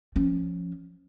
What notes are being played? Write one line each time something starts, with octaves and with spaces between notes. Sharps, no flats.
F3 C#4